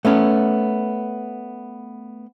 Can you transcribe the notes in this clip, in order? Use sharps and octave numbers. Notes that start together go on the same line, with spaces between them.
A3 B3 C#4